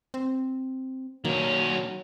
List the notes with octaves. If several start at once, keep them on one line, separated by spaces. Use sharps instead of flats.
C4
D#3 F#3 A#3 C#4